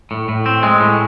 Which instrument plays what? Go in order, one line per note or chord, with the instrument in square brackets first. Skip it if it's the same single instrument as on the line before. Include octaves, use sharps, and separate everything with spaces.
[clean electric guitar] A2
A2
C4
G#3
A2